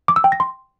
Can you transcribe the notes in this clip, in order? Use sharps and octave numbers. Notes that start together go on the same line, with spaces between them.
D6
E6
G5
A#6
C6